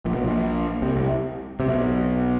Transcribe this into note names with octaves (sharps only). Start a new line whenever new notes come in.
A#1 A#2
B1 B2
A#1 A#2
C2 C3
C2 C3
C3
B1 B2